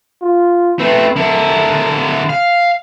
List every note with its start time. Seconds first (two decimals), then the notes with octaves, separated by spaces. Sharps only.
0.22 F4
0.80 A3 C4 B4
1.16 D3 E4 A#4
2.30 F5